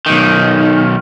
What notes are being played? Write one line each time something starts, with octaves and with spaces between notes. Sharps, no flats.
B1 D#3